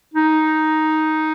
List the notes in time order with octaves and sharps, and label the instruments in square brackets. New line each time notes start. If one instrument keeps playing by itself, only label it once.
[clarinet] D#4